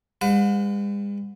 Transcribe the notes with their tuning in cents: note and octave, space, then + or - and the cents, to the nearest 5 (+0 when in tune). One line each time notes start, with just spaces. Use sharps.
G#3 -45 B4 +35 F#5 -40